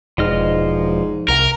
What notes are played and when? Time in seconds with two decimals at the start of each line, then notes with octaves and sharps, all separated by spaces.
0.18 E1 G#2 F3 D#5 F6
1.28 C2 A#4